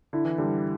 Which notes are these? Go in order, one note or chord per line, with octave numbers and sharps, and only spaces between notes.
D3 E4
E3
D3 G3